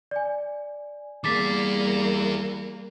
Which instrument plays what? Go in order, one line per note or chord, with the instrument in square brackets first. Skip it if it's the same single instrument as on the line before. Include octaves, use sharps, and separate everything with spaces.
[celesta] D5 G#5
[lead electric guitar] E3 G#4 [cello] G3 A#3 [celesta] D6 A6 B6